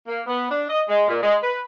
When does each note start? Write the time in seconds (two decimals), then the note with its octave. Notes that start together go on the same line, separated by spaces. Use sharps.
0.08 A#3
0.26 B3
0.51 D4
0.69 D#5
0.89 G#3
1.08 A#2
1.22 G#3
1.42 B4